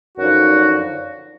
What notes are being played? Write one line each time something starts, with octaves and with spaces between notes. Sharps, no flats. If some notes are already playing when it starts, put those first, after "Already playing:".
F#2 D3 F3 D#4 F#4